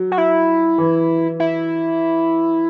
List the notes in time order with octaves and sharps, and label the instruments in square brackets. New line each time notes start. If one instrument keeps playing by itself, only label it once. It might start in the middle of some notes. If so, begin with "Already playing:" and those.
Already playing: [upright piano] F#3
[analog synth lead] F#4
E4
[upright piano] E3
[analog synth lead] E4